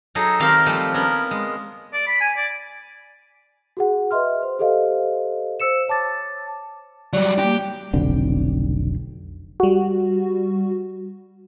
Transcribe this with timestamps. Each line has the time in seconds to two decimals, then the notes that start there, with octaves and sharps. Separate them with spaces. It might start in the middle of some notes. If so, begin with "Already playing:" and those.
0.15 F#3 D#4 G#4 A4
0.40 D#3 C4 G4 A#4 C5 F5
0.66 F3 G3 A3
0.94 B3 C#4 A#4
1.31 G#3
1.93 D5
2.07 B5
2.21 G#5
2.37 D5
3.77 F#4 G#4 F#5
4.11 B4 D#5 E5 C6 F6
4.42 C5
4.59 G4 A4 C5 D#5 F5
5.60 C5 E6 C#7 E7
5.88 C#5 A5 D6 A6
7.13 F#3 G3 D5
7.39 G3 A#3 G4
7.93 F1 B1 D3 C4
9.60 G3 F#4